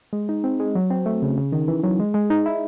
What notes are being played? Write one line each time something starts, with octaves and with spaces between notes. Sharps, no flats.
G#3
D#4
C4
G#3
F#3
C4
A3
C#3
C#3
D#3
E3
F#3
G#3
G#3
D#4
E4